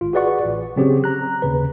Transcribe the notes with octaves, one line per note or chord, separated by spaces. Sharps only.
G#1 F4
F#4 G#4 B4 D5 F#5 C#6
A1
C#3 F#3 C4 C#4 G4 G#4
A#5 F#6
D#2 C#3 B4